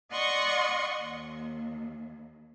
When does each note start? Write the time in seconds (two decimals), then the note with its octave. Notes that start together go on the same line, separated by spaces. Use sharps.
0.11 D5 D#5 F#5 C6 C#6 D#6
1.01 D#2